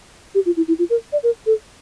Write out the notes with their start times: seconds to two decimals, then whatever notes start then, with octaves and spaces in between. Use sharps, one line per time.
0.35 G4
0.46 F4
0.57 E4
0.68 E4
0.79 F4
0.90 A#4
1.13 D5
1.23 A#4
1.46 A4